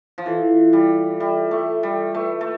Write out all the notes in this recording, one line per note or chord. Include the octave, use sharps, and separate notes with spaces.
F3
E3 F4 A4 E5
G3
G3 F4 A4 E5
A3
G3
A3 F4 B4 E5
A3